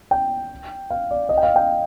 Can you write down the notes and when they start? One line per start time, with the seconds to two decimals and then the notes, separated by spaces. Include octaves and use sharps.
0.11 G5
0.90 F5
1.11 D5
1.29 D#5
1.37 G5
1.43 F5
1.56 G5